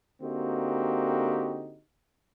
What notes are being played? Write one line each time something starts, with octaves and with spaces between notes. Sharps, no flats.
D3 A#3 C4 D#4 F#4 G4